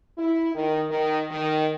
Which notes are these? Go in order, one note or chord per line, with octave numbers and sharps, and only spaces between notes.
E4
D#3
D#3
D#3